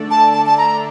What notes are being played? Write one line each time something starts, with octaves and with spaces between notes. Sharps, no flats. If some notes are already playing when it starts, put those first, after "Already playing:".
Already playing: D3 A3 D4 A4 D5
A5
A5
A5
A#5